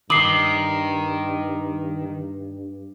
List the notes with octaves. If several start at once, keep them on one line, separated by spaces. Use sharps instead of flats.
G2 D#3 D6 D#6 C7 F#7